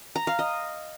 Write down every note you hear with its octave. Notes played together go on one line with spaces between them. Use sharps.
A#5
F5
D#5